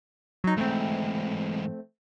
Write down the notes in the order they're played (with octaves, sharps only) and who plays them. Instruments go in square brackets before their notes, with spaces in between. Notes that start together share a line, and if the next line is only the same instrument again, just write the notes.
[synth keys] F#3 D#4
[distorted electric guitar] G#2 E3 [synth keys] A3 C4